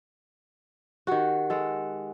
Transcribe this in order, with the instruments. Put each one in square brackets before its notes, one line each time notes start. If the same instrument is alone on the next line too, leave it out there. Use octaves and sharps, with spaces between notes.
[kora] D#3 F#4 [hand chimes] G4 F#5
[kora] G#3 A4